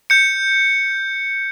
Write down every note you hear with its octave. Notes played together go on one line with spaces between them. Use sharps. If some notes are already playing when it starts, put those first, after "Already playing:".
G6 C#7